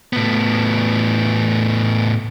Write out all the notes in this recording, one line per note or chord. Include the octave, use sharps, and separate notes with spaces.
A2 B3